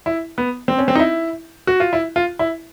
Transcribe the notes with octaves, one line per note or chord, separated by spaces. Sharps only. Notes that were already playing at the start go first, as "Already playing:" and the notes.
E4
B3
C4
C#4
C4
D#4
E4
F#4
F4
E4
F4
E4